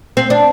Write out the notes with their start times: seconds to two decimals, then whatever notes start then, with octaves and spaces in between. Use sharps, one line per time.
0.17 C4
0.30 D4